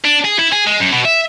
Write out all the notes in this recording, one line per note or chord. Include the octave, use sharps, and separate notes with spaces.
D4
G#4
E4
G#4
G#3
F#2
B2
E5